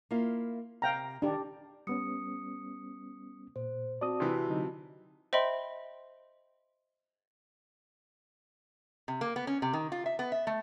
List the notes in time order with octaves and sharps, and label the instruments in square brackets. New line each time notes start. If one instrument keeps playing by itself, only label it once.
[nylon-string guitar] A#3 E4 F4
[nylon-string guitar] C3 [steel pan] F5 G5 A#5
[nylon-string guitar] D#3 [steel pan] D4 G4
[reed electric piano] G3 B3 C#4 [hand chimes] D#6 C#7
[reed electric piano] A#2 [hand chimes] C5
[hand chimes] C4 F#4 A5 [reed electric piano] D5 D#6
[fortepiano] C3 E3
[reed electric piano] D3 F#3 D#4
[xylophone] C5 D#5 E5 G5 B5 C6
[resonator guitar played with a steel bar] C3
A#3
B3
C#4
C3
D#3
F4
E5
B3
E5
A3